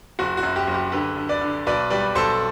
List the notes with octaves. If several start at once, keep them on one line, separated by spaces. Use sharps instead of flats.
F#1 F#4
F#4
F#2
G4
F#1
G4
D3 G4 B4
D3
B4 D5
D3
B1 B4 D5
G3 B4 D5
B1 A4 C5